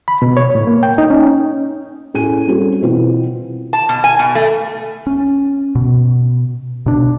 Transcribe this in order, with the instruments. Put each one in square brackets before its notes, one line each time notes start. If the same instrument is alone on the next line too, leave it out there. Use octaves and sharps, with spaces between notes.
[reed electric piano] B5
B2
C#5
A2
A#3
G5
D#4
C#4
[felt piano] A2 C#4 G#4 G#5 D#7
G3 C4 C#4 F#4 G#4 A4
B2 E3 C4 F4 B4
[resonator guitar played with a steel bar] A5
B2
G#5
B2
A3
[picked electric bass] C#4
B2
B2 D4